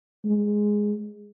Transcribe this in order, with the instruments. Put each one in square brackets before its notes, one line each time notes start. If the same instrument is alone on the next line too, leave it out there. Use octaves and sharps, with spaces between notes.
[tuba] G#3